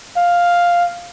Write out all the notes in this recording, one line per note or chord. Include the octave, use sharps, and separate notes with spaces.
F5